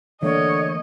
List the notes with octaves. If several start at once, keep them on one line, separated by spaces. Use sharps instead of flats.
D3 E3 A3 A#3 C#5 D#5